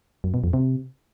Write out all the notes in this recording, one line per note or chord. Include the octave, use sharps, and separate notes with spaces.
F#2
B2
F2
C3